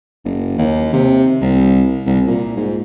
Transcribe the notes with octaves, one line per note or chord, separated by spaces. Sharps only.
F#1
D#2
C3
C2
C2
A#2
G#2